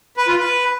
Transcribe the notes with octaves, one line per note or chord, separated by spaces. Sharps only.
B4
F4
B4